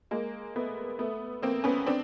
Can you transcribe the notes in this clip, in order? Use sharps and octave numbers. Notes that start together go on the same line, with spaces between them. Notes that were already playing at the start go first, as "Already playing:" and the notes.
G#3 A#3
A3 B3
A3 B3
A#3 C4
B3 C#4
C4 D4